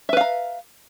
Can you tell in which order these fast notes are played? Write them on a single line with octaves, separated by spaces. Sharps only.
E5 B4 F5 A#5